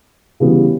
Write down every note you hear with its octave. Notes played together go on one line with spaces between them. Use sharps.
C#3 E3 G3 B3 F#4